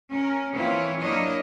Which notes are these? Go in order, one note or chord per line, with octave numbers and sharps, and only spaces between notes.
C#4 A#4
E3 A#3 C4 E4 F4 C#5
F#3 A#3 D4 E4 C#5 D#5